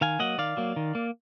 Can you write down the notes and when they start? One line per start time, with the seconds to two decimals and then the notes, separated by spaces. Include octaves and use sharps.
0.01 D#3 F5 G#5
0.19 F#3 A#3 D#5 F#5
0.38 D#3 D5 F5
0.57 F#3 A#3
0.76 D#3
0.95 A#3